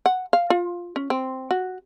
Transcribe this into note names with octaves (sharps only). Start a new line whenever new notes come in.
F#5
F5
F4
C#4
C4
F#4